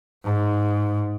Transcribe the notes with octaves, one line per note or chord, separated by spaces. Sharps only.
G#2